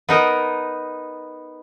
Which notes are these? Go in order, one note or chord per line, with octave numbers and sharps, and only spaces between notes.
B3 D#4 A#4